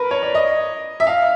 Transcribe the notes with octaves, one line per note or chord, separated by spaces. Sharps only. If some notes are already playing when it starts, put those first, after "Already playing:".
Already playing: A#4 B4
C#5
D5
D#5
E5
F5